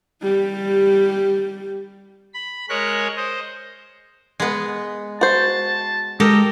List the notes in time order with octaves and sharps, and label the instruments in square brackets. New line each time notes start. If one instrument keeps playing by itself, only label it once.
[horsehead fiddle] G3 G4
[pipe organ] B5
G#3 A#4 C#5 F#6
C5 D#5
[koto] G#3 B3
[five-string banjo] F#4 C5 [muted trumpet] A5
[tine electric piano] G#3 [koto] G4 A4 A#4 [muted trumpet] D#5